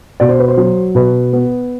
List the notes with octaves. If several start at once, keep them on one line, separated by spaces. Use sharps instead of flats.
B2 D5
C5
B4
C5
F#3
B2 B4
B3